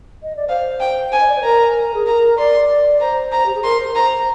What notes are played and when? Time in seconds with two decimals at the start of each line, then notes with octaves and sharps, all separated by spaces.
0.23 D#5
0.36 D5
0.48 C5 F5
0.80 G5
1.12 G#5
1.20 D#5
1.27 D5
1.36 C5
1.44 A#4 A#5
1.94 G#4
2.06 A#4 A#5
2.38 D5 C6
2.69 D5
3.00 C5 A#5
3.32 A#5
3.46 G4
3.55 G#4
3.64 A#4 C6
3.80 C5
3.95 C5 A#5